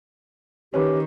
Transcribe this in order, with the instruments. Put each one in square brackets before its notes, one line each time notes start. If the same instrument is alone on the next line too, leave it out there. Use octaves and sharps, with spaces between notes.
[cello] D#3 [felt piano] C#4 B4 [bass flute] G4